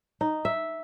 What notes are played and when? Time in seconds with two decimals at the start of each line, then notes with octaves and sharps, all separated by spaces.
0.21 D#4
0.45 E5